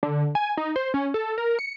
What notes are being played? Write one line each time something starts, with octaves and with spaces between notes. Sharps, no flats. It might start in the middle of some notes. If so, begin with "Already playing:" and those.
D3
G#5
D#4
C5
C#4
A4
A#4
C#7